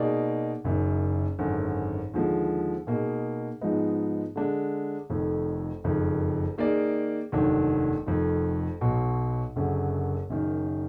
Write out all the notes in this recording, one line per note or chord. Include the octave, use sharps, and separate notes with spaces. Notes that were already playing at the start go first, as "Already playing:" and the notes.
Already playing: B2 A#3 D#4 G#4 D5
F#1 F#2 D#3
G#1 F#2 D3
D#2 D3 F3 G#3
B2 A#3 D#4 G#4
G#2 F3 G#3 B3 D#4
D3 G#3 D4
F1 F2 D#3
F#1 F2 D#3
D#3 A#3 D#4 G#4 D5
F1 D#2 D#3 F#3 D4
F1 F2 D#3
B1 B2 F#3
F#1 F#2 D3 F#3
F#1 F#2 D#3